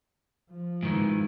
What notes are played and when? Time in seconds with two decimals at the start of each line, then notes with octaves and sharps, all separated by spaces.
0.51 F3
0.83 G#2 D#3 E3